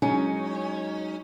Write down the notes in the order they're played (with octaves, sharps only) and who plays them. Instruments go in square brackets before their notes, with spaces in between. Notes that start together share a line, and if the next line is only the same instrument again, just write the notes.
[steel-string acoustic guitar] F#3 G#3 D#4 [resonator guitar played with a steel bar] C#4